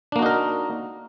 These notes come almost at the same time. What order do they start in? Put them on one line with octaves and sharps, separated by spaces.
D4 A#3 F#4 D#4 A#4